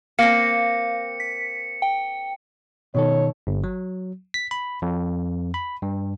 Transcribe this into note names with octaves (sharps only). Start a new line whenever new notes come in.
A#3 C4 F5 A#6 C#7
B6
G5
B2 D#3 A4 C#5
G1
F#3
B6
B5
F2
B5
G2